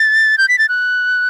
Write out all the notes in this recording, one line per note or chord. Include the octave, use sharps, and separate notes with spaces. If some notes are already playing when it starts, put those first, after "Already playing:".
Already playing: A6
G6
B6
A6
F#6